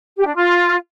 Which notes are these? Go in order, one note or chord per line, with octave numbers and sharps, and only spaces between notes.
G4
D4
F4